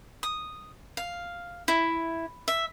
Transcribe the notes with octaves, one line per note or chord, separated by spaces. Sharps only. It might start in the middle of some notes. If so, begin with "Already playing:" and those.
D#6
F5
E4
E5